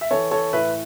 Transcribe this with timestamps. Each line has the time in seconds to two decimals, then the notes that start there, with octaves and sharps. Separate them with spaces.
0.01 E5
0.11 E3 A4 C#5
0.31 A4 C#5
0.53 A2 B4 E5